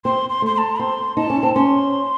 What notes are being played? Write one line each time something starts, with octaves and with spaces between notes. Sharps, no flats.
C4 C6
C6
A3 C6
C6
A5
C4 C6
D#4 A5
C#4
C4
C#4 C6